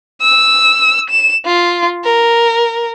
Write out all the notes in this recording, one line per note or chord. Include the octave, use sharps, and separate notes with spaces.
E6
E7
F4
A#4